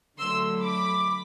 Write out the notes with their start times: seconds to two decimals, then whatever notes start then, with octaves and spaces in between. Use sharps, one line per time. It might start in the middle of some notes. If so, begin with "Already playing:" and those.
0.19 D3 F#3 A3 C6 E6
0.62 B5 D6